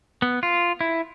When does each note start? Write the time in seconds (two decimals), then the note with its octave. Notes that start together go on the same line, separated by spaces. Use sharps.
0.22 B3
0.43 F4
0.81 E4